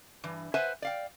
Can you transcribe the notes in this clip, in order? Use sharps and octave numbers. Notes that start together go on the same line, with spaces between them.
G2 E3
B4 C5 E5 F#5 G#5
D5 F5 G5